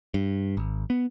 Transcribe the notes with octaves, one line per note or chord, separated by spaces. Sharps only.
G2
G#1
B3